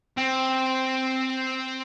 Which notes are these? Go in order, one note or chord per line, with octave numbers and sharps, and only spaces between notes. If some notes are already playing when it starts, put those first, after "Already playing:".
C4